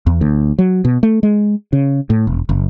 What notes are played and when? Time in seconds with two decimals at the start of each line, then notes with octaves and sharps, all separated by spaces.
0.07 E2
0.21 D2
0.59 F#3
0.85 B2
1.03 A3
1.23 G#3
1.73 C#3
2.10 A2
2.27 E1
2.49 F#1